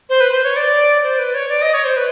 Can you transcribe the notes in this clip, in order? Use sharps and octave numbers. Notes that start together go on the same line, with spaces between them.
C5
B4
C5
C#5
D5
C5
B4
C#5
D5
D#5
C#5
C5
B4